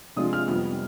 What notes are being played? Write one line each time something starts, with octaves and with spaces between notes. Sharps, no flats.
C3 F3 G#3 D4 F4 D#6
F6
F2 C3 G3 B3 F6